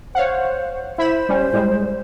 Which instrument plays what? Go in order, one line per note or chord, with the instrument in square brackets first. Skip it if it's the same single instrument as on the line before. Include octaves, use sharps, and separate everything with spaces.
[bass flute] C5 [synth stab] C#5 F5 F#5
[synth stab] E4 B5 E7 [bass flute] C5
[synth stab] G3 C#4
A2 G3 G#3